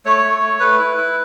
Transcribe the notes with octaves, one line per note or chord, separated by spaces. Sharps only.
A3 C#5
A3
A3
A3 B4
E4
E4